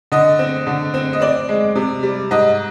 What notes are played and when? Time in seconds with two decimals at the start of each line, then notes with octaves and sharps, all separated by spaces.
0.12 D3 D#5
0.39 C4
0.67 D3
0.94 C4
1.13 D#5
1.21 C4 D5
1.49 G#3
1.75 C3
2.03 G3
2.31 G#2 D#5